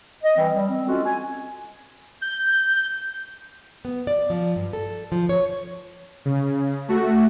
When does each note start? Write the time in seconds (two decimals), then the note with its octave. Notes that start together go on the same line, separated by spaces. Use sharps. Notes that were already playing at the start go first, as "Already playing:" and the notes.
0.23 D#5
0.36 E3 G3 C4
0.55 G3
0.69 C4
0.87 G#3 C#4 F4 F#4 A4
1.04 G#5
2.21 G6
3.85 B3
4.07 D5
4.30 F3
4.56 G2
4.73 A4
5.12 F3
5.29 C#5
6.25 C#3
6.88 A3 F#4